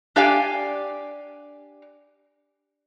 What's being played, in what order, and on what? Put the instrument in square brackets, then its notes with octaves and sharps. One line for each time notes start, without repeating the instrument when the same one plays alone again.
[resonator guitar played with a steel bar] D4 G4 D5 F5 G#5